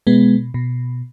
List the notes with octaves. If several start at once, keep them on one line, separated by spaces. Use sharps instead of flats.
B2 G#3 B3
B2